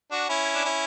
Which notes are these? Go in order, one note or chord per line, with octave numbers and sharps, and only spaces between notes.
D4 F#4
C#4 E4
D4
C#4 E4